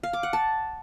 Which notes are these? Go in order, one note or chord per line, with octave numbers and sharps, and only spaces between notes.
F5
D6
F#5
A5